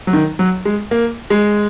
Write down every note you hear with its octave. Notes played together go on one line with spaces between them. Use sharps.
F#3
D#3
F#3
G#3
A#3
G#3